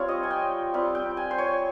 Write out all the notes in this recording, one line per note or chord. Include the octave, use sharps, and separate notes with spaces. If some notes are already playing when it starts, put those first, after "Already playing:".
Already playing: G3 C4 F4 C#5
D#5
G#5
G5
G3 C4 F4
G5
G#5
C5
C#5